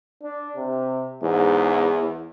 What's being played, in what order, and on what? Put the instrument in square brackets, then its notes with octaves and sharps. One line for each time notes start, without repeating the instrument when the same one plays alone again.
[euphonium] D4
C3
[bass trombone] E2 [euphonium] G#2